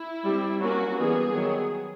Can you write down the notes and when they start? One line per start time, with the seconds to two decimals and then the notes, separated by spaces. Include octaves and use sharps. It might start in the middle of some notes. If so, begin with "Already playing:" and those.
Already playing: E4
0.24 G3 C4
0.60 F#3 A#3 C#4 F#4
0.97 E3 G3 B3 G#4
1.34 D#3 F#3 B3